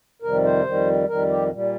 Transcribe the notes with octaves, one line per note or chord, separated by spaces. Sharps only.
F2 C3 D#3 G3 A#4
C5
F2 D#3 G3
F2 D#3 G3 A#4
G4
A#2 G3